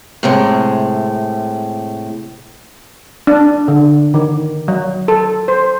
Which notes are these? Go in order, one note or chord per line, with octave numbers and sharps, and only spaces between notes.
A2 C3 G#3
D4
D3
D#3
F#3
A4
C5